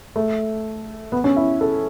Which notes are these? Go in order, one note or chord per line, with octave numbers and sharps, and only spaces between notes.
A3
B3
C#4
E4
A4